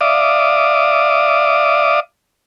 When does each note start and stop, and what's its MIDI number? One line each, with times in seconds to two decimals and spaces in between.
0.01 2.00 74
0.01 2.00 76
0.01 2.00 77
0.01 2.00 86
0.01 2.00 87